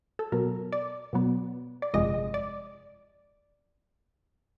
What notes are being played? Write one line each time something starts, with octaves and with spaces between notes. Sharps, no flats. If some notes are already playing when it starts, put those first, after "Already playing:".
A4
B2 F#3 B3 A#4
D5
B2 F#3 B3
D5
G1 F2 C3 F3 G#3 D#5
D5